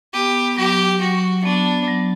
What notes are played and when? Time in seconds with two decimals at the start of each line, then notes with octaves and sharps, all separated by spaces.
0.14 B3 G4
0.57 F#3 G4
1.01 F#3 F#4
1.45 B3 D4
1.88 F#3